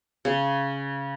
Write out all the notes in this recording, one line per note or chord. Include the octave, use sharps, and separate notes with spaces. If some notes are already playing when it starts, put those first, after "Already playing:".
C#3